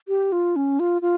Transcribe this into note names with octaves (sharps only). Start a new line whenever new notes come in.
G4
F4
C#4
F4
F4